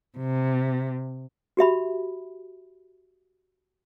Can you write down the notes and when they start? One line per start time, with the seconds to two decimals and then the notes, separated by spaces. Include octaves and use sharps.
0.18 C3
1.57 F#4 G4 E5 B5